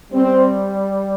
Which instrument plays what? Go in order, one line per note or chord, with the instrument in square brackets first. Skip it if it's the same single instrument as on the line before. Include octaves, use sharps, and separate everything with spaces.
[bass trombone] G3 [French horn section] C4